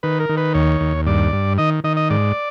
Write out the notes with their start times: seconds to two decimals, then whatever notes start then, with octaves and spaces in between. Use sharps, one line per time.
0.03 D#3 B4
0.20 A#4
0.29 D#3
0.37 B4
0.54 D#2 C#5
0.81 D#2
1.07 G2 D5
1.33 G2
1.58 D#3 D#5
1.84 D#3 D#5
1.97 D#5
2.10 G#2 D5